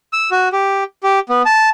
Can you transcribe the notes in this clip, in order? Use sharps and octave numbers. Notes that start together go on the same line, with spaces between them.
E6
F#4
G4
G4
B3
A5